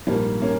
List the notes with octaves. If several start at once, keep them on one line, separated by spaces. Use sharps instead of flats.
A#1 G#2 F3 G3 A#3
A#3 C#4